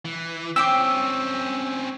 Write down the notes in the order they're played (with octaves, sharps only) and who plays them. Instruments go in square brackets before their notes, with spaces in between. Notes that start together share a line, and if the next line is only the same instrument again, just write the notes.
[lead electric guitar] E3
[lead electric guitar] C4 C#4 [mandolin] G4 G5 D6 [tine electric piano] E6